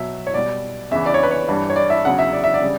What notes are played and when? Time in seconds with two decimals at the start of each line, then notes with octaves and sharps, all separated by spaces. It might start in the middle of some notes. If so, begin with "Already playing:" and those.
Already playing: B2 F#3 E5
0.27 C#5
0.34 B2 G3 D5
0.91 E2 C#3 E3 E5
1.06 D5
1.14 C#5
1.23 B4
1.31 C#5
1.48 G2 E3 G3
1.70 C#5
1.76 D5
1.90 E5
2.05 E2 C#3 F#3 F#5
2.19 E5
2.33 D5
2.44 E5
2.54 D5
2.62 C#3 G3